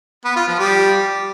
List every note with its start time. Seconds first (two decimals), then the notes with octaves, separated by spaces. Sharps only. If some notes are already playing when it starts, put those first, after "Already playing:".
0.25 B3
0.36 F4
0.48 F3
0.59 G3